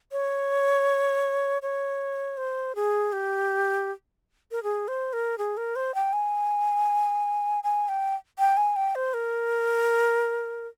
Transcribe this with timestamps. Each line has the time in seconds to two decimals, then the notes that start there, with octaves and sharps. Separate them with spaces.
0.12 C#5
1.62 C#5
2.37 C5
2.75 G#4
3.12 G4
4.51 A#4
4.63 G#4
4.88 C5
5.13 A#4
5.38 G#4
5.57 A#4
5.76 C5
5.95 G5
6.13 G#5
7.64 G#5
7.88 G5
8.39 G5
8.57 G#5
8.76 G5
8.95 C5
9.14 A#4